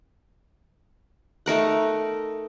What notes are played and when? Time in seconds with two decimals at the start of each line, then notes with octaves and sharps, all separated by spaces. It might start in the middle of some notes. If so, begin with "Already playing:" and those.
1.46 A3 D#4 A#4 F#5